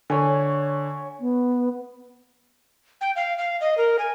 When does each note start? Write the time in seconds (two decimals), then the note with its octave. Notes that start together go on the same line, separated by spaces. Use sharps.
0.10 D3 C#5 G#5
1.20 B3
3.01 G5
3.16 F5
3.38 F5
3.61 D#5
3.78 A#4
3.99 G#5